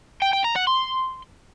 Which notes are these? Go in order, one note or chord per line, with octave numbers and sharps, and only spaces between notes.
G5
G5
A#5
F#5
C6